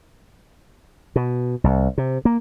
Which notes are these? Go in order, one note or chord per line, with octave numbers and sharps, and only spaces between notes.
B2
C2
C3
A#3